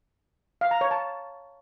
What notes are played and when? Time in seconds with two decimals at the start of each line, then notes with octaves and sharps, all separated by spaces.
0.61 F5
0.71 A#5
0.81 C#5
0.91 A5